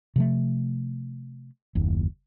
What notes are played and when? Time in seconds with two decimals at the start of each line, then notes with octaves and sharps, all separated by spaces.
0.16 C3 F3 A3
1.75 F#1 D#2